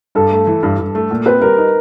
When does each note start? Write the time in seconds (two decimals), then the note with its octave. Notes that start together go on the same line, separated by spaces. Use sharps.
0.15 G2 A4
0.31 A3
0.47 E3
0.63 G2
0.79 G2
0.95 A3
1.11 A#2
1.26 C4 B4
1.42 G3 A#4
1.58 D#4